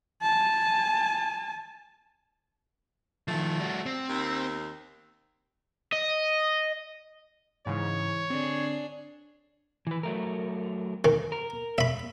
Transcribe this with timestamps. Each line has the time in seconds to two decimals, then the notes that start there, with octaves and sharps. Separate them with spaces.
0.22 G#5 A5
3.28 D#3 F3 A3
3.60 G3 F#4
3.86 C4
4.09 D#2
5.92 D#5
7.66 G#2 C#3 E3 C#5
8.30 D3 C4 D4 G#4
9.87 E3 B4
10.03 F#3 A3 A#4
11.05 D#3
11.32 A#4
11.78 E5 B5